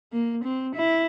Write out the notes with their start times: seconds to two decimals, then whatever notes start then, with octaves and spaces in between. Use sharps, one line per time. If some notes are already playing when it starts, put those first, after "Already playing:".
0.12 A#3
0.44 C4
0.75 E4